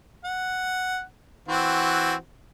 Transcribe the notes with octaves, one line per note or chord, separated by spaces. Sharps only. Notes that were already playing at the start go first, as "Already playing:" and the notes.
F#5
E3 C4 F#4